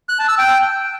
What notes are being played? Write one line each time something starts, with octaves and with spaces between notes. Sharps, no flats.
F#6
A5
E6
G5